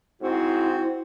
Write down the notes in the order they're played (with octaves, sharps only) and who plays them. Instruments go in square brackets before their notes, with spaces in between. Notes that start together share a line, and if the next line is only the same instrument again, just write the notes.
[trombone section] G#2 C4 [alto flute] E4 [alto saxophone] F#4